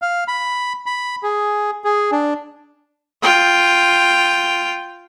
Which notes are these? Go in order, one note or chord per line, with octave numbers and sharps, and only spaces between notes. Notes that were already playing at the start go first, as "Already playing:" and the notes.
F5
B5
B5
G#4
G#4
D4
F4 G5